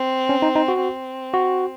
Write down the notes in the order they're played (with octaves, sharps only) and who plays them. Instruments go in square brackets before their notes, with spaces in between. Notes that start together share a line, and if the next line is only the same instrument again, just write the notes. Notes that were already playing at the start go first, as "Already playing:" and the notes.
Already playing: [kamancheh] C4
[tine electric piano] C#4
D#4
D#4
F#4
[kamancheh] C4
[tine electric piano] F#4